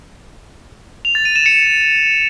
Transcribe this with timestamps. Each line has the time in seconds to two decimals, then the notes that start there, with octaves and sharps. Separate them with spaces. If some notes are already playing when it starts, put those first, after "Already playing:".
1.05 F7
1.15 A6
1.25 D#7
1.36 E7
1.46 C#7